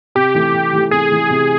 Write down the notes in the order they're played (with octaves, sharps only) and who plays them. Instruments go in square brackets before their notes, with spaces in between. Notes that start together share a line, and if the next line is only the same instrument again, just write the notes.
[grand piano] C3 [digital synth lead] G4
[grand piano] E3 A3
C3
E3 A3
[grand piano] C3 [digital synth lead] G#4
[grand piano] E3 A3
C3